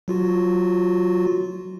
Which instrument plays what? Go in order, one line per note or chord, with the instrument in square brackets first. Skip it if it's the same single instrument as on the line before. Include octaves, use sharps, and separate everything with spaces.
[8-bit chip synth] F#3 F4 F#4